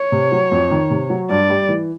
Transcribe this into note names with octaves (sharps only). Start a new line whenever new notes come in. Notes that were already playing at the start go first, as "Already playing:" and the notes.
Already playing: C#5
C3
F#3
F2
D#3
C3
F#3
G2 D5
G3
E3